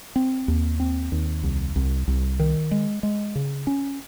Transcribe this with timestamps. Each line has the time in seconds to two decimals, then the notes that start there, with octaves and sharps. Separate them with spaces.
0.16 C4
0.48 D#2
0.80 C4
1.12 D#2
1.43 C2
1.76 C2
2.08 C2
2.40 D#3
2.71 G#3
3.03 G#3
3.35 C#3
3.67 C#4